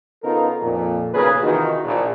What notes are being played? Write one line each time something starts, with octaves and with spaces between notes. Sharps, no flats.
C#3 B3 D#4 F4 A4 A#4
F2 A#2
B1 A#2 C#3 G#4 A#4 B4
C3 D#3 E3 D#4 F4 F#4
A#1